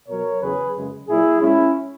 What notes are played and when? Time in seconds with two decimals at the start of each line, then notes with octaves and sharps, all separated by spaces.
0.09 B2 F#3 A#4 C#5
0.42 E2 C#3 F#3 G#4 B4
0.76 F#2 C#3 G#3
1.08 A#2 F#3 E4 G#4
1.41 A#2 G#3 C#4 E4